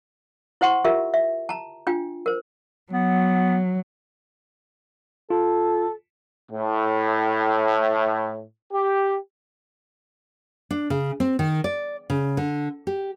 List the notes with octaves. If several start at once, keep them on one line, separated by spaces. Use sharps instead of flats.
E4 C5 F#5 C6 C#6
F4 G4 A#4 E5
E5
A5 A#5
D4 F4 G5
A#4 C5
F#3 B3
F4 A4
A2
G4
D4
C#3
C4
D#3
D5
C#3
D3
G4